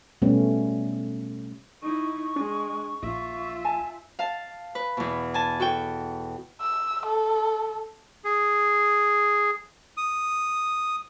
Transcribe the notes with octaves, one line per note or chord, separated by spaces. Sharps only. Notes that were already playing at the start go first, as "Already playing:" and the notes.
B2 G3 A3 B3 C#4
D#4 E4 C#6
G#3 D4
A#1 F4 E5
G#5 A5
F5 A5
B4
E2 B2
G#5 A5
F#4 A4 G5
E6
A4
G#4
D#6